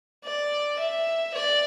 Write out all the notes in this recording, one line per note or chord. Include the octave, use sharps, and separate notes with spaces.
D5
E5
D5